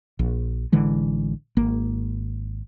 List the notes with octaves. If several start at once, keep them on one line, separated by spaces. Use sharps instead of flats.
A#1
A1 D3 E3 G#3
G#1 A#3